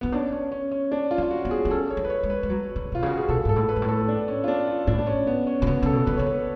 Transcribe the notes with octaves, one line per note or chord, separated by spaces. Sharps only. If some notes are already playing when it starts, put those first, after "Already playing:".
B3 C#4
C#4 D4
C#4
C#4
C#4
D4
F4
C#4
F4
F#4
B3
G#4
D4
C#4 A4
C#5
D4
B4
C#5
G#3
B4
G#3
F#3
D3
B2 F4
C#3
F#4
G#4
B2 A4
G#2 A4
A2
B4
G#2
A2
A4
D4
C#4
F4
D4
F4
A2 D4
D4
C#4
B3
C#4
B2
C#3 B3
C#3 A4
B2
D3 B4
C#3 C#5
B4